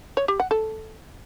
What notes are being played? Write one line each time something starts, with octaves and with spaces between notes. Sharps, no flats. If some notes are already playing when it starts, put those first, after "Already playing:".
C#5
G4
F#5
A4